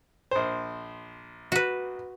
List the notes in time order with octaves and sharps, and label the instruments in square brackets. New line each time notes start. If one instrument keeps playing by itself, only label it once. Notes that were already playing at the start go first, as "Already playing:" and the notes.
[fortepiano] A#1 C5
[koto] F#4 B4